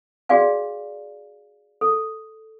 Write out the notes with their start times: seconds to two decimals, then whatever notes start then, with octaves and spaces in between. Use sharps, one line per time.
0.29 F#4 G#4 D5 F5 G#5
1.81 A4